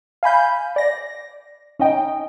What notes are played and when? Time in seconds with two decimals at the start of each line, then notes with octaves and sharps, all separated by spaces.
0.23 F5 G#5 B5 G6
0.76 D5 A#6
1.79 C#4 D#4 D#5 G5